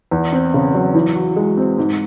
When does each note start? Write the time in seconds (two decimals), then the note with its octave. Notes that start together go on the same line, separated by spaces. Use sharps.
0.11 E2
0.32 C4
0.54 C#3
0.74 F#3
0.94 E3
1.15 F#4
1.36 G#3
1.57 C4
1.78 G#2